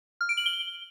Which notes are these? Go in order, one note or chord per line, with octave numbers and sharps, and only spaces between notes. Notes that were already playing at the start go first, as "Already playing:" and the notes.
F6
D7
F#7
G7